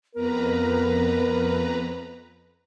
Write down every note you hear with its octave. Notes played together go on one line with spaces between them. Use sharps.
F2 B3 A#4 B4 A#5